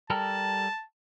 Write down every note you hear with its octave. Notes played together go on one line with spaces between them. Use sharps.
G3 A4 A#4 A5